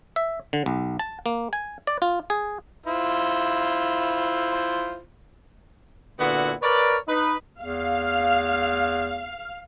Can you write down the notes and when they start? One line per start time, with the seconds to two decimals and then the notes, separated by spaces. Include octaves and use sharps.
0.16 E5
0.53 D3
0.66 B1
0.99 A5
1.26 A#3
1.53 G#5
1.87 D5
2.02 F4
2.30 G#4
2.86 E4 F4 C5
6.20 A#2 D3 B3 E4 F#4
6.62 A#4 B4 C#5 D5
7.08 D#4 B4
7.61 E2 F5